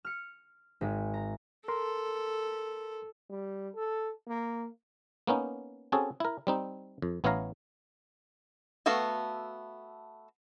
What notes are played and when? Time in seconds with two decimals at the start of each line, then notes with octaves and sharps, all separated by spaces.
0.05 F6 C#7
0.81 G#1 G#3
1.14 A#5
1.68 A4 A#4 C6
3.30 G3
3.75 A4
4.27 A#3
5.27 A#3 B3 C#4 D#4
5.92 C4 C#4 F#4 G#4 A4
6.20 E4 A#4
6.47 G3 C4 D#4
7.02 F2
7.24 A1 B3 E4 C#5 F5 A#5
8.86 A3 B3 F#4 A4 F5